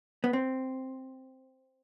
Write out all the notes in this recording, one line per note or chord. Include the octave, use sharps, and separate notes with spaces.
B3
C4